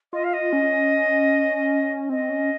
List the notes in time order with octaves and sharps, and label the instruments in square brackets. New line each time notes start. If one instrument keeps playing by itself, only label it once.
[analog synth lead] F4 [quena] D#5
[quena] F5
D#5
[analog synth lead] C#4
[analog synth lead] C4 [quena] D#5
[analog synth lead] C#4